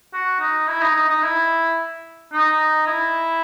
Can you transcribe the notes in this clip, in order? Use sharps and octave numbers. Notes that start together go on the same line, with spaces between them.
F#4
D#4
E4
D#4
D#4
D#4
E4
D#4
E4